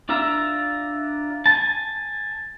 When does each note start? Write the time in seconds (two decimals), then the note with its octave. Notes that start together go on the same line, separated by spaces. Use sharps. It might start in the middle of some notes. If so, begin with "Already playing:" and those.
0.09 D4 F4 A#4 E5 A#5
1.46 G#5 A5